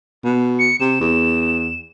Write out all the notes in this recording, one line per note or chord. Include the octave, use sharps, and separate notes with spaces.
B2
C#7
C3 E7
E2